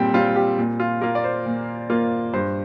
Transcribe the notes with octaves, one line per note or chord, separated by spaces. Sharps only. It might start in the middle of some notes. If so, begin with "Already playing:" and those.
Already playing: A#2 G3 C4 G5
G3 C4 F4
G4
A#2
F4
A#3 F4 A#4
D5
C5
A#2
A#3 F4
G2 C5